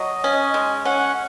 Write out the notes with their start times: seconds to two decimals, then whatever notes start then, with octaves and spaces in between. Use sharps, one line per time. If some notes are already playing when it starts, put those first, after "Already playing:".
Already playing: F#3 D#5
0.24 C#4
0.54 G#3
0.85 C#4 F#5